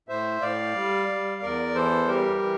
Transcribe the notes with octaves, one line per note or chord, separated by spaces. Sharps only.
A2 C5 E5
A2 D5 F5
G3
G3
E2 A#4 D5
E3 A4 C5
G3 G4 A#4
E3